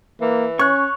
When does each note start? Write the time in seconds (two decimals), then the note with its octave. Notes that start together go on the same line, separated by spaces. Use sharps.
0.21 E3 A#3
0.59 C#4 C#5 C#6 F#6